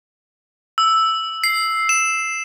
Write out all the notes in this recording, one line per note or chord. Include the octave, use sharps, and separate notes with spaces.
E6
C7
E7